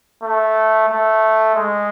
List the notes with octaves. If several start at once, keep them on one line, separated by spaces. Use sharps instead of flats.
A3
A3
G#3